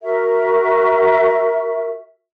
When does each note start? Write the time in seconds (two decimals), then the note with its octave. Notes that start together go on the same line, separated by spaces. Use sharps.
0.02 F#4 A#4 E5